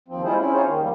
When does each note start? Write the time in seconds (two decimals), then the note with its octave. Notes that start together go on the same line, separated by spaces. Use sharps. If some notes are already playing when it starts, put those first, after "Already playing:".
0.08 D#2 F3 C4
0.24 G3 G#3 E4 F4 G#4 C5
0.38 C4 C#4 E4
0.53 C#4 D#4 F4 G#4 C5 C#5
0.66 D#2 D#3
0.81 D#2 F3 G3 A#3